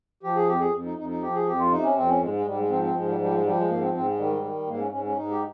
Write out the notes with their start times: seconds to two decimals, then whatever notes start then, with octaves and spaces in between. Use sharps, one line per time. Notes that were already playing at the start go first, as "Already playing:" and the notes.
0.23 F3 G4
0.35 G#4
0.47 F2 G4
0.60 G#4
0.73 F2
0.85 D#4
0.97 F2 D#4
1.09 D#4
1.22 F3 G4
1.35 G#4
1.47 F2 G4
1.59 F4
1.71 C3 D#4
1.83 C#4
1.96 F2 C4
2.08 C#4
2.21 G#2 G#3
2.33 G#3
2.45 G#2 G3
2.58 G#3
2.70 F3 C4
2.82 C4
2.94 G#2 G#3
3.07 G3
3.19 F3 G3
3.31 G#3
3.44 F3 G3
3.57 G#3
3.68 G#2 A#3
3.81 C4
3.93 G#2 C4
4.06 G#3
4.18 D#3 G3
4.43 D#3
4.67 G#2 A#3
4.79 C#4
4.91 G#2 C#4
5.05 C#4
5.16 G#2 D#4
5.30 G4